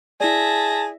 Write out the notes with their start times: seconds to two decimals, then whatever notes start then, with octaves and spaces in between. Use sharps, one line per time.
0.20 E4 G#4 D5 E5 A5 A#6